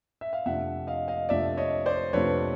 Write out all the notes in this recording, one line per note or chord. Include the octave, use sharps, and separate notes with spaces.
E5
F5
F2 C3 F3 A3 D4 E5 F#5
D#5 F5
D#5 F5
F2 C3 F3 A3 D4 D5 E5
C#5 D#5
C5 D5
F2 C3 F3 A3 D4 B4 C#5